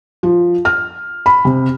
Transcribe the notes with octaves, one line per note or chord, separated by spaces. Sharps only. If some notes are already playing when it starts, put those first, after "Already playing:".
F3
F6
B5
C3